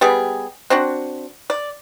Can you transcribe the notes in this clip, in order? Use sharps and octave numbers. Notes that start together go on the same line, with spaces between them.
G3 B3 G4 G#4
C4 D4 F#4
D5